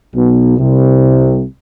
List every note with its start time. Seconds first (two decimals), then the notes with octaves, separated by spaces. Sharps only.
0.14 B1 B2
0.59 C2 C3